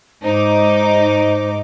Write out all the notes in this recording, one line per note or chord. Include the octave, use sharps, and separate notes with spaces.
G#2 D#4 C5 D6